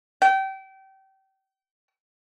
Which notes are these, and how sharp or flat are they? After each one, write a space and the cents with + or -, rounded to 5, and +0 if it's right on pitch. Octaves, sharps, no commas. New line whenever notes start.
G5 -30